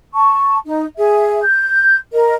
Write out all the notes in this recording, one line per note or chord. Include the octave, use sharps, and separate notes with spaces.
A5 C#6
D#4
G#4 E5
G6
A#4 D#5